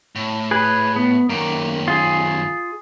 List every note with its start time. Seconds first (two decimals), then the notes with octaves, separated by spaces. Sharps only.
0.15 A2
0.51 G#4 B4
0.96 B3
1.29 F#2 D#3 A#3
1.88 F4 G#4